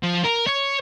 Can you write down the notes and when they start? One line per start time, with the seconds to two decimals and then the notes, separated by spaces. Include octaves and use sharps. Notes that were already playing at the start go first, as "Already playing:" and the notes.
0.03 F3
0.25 A#4
0.47 C#5